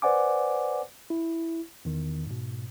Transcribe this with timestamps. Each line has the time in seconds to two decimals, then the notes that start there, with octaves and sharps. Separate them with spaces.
0.02 B4 C5 D5 F#5 G#5 D6
1.10 E4
1.85 E2 D#3
2.26 G#2 B2